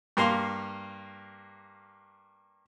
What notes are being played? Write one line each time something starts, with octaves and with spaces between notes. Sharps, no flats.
G2 A#3 F5 C6